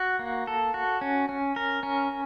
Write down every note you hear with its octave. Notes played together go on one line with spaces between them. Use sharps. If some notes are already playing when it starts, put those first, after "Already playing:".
Already playing: F#4
A#3
A4
F#4
C#4
C#4
A#4
C#4